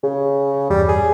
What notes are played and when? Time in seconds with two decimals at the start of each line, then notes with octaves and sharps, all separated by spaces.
0.04 C#3 G#4
0.70 E2 G2 G3
0.89 G#4